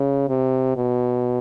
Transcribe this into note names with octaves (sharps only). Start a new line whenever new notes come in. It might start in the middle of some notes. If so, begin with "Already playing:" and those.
Already playing: C#3
C3
B2